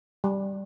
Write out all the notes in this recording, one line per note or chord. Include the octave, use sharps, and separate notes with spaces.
G3